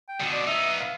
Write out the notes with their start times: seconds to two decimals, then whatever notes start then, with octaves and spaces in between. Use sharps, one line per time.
0.08 G5
0.20 B2 D3
0.32 D5
0.47 B3 D#4 E5
0.80 F5